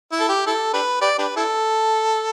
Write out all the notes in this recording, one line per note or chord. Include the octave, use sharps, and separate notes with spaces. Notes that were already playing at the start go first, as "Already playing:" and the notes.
E4
A4
G4
E4 A4
D4 G4 B4
G4 B4 D5
D4 G4 B4
E4 A4